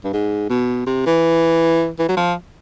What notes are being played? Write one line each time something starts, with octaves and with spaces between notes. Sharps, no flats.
G2
G#2
B2
C3
E3
E3
F#3
F3